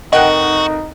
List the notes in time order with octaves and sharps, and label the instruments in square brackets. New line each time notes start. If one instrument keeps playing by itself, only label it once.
[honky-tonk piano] F1 A#4 F#6 [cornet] D#4 [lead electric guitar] F#4 [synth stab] D#5 F#5 G5